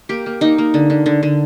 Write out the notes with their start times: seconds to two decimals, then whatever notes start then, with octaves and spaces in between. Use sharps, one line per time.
0.09 A#3 G4
0.26 A#3
0.41 A#3 D#4
0.58 A#3
0.74 D3
0.90 D3
1.06 D3
1.23 D3